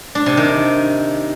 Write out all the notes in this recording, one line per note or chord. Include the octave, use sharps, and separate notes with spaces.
D4
C3
D#3